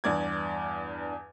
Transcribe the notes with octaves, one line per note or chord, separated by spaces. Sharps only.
E2 G2 D5 G#6